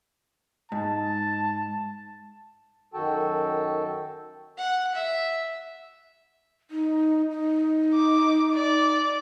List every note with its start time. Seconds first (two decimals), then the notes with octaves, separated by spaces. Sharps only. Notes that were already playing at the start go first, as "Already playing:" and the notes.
0.72 G#2 A5
2.94 F#2 D#3 F#4 A4 G5 A5
4.58 F#5
4.95 E5
6.71 D#4
7.31 D#4
7.94 D6
8.54 D5